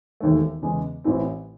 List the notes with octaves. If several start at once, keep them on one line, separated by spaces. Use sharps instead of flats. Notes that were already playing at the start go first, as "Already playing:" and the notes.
E1 D#2 D#3 A3
E2 C#3 G#3
A1 A2 E3 C4